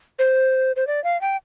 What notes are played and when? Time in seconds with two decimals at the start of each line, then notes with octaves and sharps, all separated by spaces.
0.19 C5
0.76 C5
0.87 D5
1.04 F5
1.21 G5